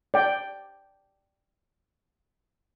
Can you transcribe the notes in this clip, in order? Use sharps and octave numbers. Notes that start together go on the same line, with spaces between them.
D5 G5